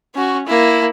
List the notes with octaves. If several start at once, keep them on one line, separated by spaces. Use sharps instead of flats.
C#4 F#4
A#3 E4